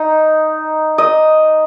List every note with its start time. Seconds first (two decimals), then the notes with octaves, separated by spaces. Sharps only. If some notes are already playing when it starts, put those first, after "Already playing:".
Already playing: D#4
0.98 D#5